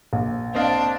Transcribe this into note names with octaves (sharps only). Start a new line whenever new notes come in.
A#1
C4 D4 D#5 F5 A5